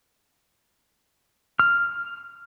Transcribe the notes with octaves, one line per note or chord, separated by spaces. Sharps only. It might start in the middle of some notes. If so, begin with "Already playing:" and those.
F6